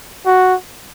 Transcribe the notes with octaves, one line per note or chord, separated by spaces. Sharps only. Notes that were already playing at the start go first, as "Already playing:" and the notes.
F#4